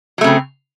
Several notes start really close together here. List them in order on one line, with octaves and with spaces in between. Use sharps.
F#3 A3 C#3 C4